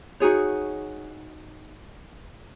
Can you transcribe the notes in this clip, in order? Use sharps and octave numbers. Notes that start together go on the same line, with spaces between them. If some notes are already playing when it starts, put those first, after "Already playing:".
D#4 F#4 G#4 C#5